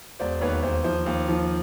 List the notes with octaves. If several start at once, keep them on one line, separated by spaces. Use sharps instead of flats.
E1 C5 D5
D#2 B4 C#5
D#2 C5
F3 C5
D#2
F3